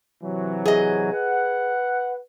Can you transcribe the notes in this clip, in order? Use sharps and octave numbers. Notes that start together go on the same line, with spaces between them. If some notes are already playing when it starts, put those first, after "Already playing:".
C3 E3 F#3
G#4 D#5
B4 F#5